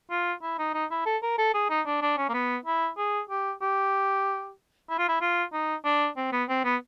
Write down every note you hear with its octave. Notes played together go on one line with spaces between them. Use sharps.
F4
E4
D#4
D#4
E4
A4
A#4
A4
G#4
D#4
D4
D4
C#4
A#3
B3
E4
G#4
G4
G4
E4
F4
E4
F4
D#4
D4
C4
B3
C4
B3